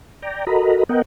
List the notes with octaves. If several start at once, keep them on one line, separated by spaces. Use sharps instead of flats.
D5 G5 A#5
F#4 A4 A#4 D#5 A#5 B5
B3 A#4 D#5 F#5 G5